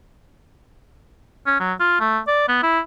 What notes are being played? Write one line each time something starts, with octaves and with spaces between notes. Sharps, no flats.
C#4
F#3
F4
A3
D5
B3
E4